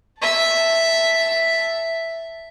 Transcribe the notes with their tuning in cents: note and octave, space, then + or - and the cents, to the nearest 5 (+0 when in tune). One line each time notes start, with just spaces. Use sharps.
E5 +0 A5 +0